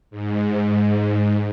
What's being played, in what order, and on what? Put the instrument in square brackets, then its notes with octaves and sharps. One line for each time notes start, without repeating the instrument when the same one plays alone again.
[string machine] G#2